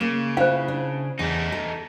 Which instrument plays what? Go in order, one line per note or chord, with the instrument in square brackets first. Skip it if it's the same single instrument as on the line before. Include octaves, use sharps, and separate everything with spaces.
[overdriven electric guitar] C#3 [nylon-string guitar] A#3
[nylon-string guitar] E4 F4 [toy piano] C5 F5
[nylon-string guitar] D4
[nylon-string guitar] E2 [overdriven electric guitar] A3 D#4
[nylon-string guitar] A4